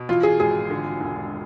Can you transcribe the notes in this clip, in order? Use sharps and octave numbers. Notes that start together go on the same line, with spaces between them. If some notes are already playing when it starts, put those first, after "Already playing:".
Already playing: B2
E3 F4
G#4
G#1 G#4
D3
E1